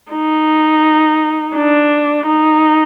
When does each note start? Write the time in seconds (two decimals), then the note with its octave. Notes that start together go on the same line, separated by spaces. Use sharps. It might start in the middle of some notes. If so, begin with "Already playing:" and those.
0.12 D#4
1.55 D4
2.26 D#4